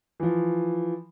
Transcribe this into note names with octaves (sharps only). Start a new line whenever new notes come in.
E3 F3